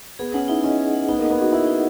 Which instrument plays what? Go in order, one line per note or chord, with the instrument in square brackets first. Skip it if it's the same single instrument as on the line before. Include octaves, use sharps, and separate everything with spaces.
[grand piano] B3 [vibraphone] G#4
[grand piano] C#4 [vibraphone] F#5
[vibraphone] D#4 [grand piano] E4
[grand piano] C#4 [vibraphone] D#5
[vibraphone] G#4
F#5
[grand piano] B3 [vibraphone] D#4
[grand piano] A#3 [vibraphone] D#5
[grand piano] B3
[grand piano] F#4 [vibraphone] G#4
[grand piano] E4 [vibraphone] F#5
[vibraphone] D#4